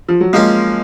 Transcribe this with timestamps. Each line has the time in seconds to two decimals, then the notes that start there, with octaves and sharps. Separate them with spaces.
0.08 F3
0.21 F#3
0.33 F3 G#3 A#3 C#4